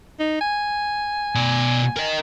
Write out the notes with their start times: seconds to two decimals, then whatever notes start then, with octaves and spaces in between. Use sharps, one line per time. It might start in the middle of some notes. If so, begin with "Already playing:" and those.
0.20 D#4
0.41 G#5
1.35 B2 D5
1.97 A#4 D#5